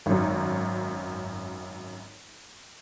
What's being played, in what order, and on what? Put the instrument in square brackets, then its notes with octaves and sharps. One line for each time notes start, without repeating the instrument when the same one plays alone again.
[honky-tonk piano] G#1 F#2